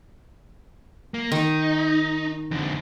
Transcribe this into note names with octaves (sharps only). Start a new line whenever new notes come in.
A#3
D#3 D#4
F2 D3